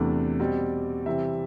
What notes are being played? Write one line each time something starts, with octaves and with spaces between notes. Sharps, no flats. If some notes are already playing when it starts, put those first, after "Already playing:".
Already playing: E2 C3 E3 A3 D4 D5
B2 G3 C4
C3 E3 G3 C4 E5